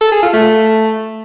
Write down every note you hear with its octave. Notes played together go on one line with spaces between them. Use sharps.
A4
G#4
F4
A3